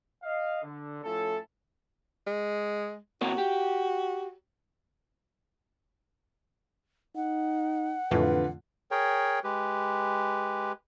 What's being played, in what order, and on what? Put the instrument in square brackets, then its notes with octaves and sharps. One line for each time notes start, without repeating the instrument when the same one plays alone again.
[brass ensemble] D#5 F5
D3
A2 F3 C#4 E4 A4
[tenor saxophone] G#3
[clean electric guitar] C3 A#3 C#5 [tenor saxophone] F#4
[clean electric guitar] G4
[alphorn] D#4 [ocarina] F#5
[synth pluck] F2 A2 E3 [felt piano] D3 F4 [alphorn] B4
[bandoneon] G#4 A#4 C#5 G5
G#3 G4 B4